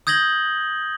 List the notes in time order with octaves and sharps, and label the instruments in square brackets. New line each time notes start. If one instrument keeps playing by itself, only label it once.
[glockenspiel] D#6 G6 G#6 A#6 F#7 G7